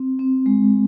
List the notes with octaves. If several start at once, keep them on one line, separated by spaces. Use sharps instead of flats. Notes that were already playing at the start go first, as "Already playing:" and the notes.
Already playing: C4
C4
G#3